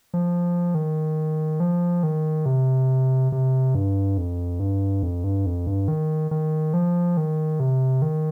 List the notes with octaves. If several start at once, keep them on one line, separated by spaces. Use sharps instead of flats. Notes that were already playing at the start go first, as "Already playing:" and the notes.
F3
D#3
F3
D#3
C3
C3
G2
F2
G2
F2
G2
F2
G2
D#3
D#3
F3
D#3
C3
D#3